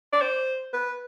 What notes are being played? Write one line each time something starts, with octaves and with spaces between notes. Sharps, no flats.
D5
C5
B4